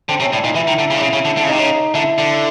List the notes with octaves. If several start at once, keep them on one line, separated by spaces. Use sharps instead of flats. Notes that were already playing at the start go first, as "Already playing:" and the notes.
D3 C4
C3 C#4
A2 D4
A#2 D#4
E3 E4
D#3
D3
C#3
D3
C#3
C#3
D3
D3
C#3
C3 D#4
C#3
D3 E4
D3